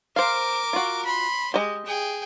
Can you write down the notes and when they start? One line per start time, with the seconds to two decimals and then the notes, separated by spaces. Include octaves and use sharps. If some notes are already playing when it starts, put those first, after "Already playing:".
0.16 A#4 C5 F5 D6
0.73 F4 F#4
1.05 B5 C6
1.54 G#3 G4 D#5
1.86 G#4 G5